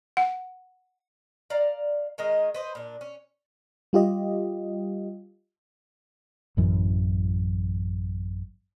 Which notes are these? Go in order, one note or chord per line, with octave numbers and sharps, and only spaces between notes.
F#5
D5 F5 A#5
D#3 G#3 A#4 D#5
B4 C5 D#5
A#2 D4
C#4
G3 F4 G4 D#5
A1 F#2 E3